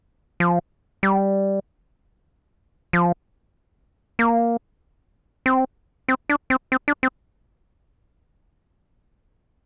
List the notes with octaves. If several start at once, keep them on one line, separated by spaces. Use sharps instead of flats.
F3
G3
F3
A#3
C4
C4
D4
C4
C4
D4
C4